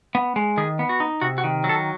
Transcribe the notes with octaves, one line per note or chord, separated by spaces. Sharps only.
B3
G#3
D#3 G#4
B3
F#4
D#4
C3 F#4
F#4
D#3
F#3
A4